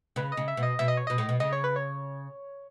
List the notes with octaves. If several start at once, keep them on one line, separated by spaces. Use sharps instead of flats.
C#3 B4
D#5
C#3
E5
B2
D#5
B2 E5
D#5
C#5
B2 D#5
A2
B2
C#3 D#5
C#5
B4
C#5